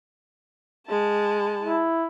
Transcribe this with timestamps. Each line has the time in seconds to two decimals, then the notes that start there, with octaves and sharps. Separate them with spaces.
0.88 G#3 A5
1.63 E4